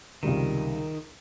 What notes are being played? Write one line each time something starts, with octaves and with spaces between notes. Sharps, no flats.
C#2 C3 D#3 G3